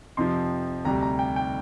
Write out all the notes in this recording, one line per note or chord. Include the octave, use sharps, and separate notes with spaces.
F2 C3 F3 C6
D2 C3 G3 A#5
A#5
G5
G5